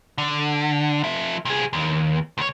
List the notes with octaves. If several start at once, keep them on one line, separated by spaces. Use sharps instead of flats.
D3
F3 E5
C2 G#4
D#2
C#2 C#5